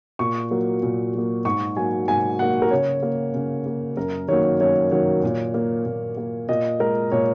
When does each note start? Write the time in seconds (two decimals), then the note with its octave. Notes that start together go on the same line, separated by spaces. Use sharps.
0.19 A#2 C#6
0.51 F#3 A#3
0.83 A#2
1.14 F#3 A#3
1.45 G#2 C#6
1.77 F#3 A#3 G#5
2.08 G#2 G#5
2.39 F#3 A#3 F#5
2.62 A#4
2.71 C#3 C#5
3.03 A#3
3.34 C#3
3.66 A#3
3.97 F#2 A#4
4.28 D#3 F#3 A#3 C#5
4.60 F#2 C#5
4.91 D#3 F#3 A#3 C#5
5.23 A#2
5.54 A#3
5.86 A#2
6.17 A#3
6.49 A#2 D#5
6.80 G#3 A#4
7.12 A#2 C#5